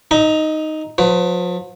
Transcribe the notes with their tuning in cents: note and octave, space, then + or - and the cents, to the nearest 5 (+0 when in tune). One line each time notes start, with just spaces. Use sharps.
D#4 +0 E5 -45 A#5 +0
F3 +45 B4 +30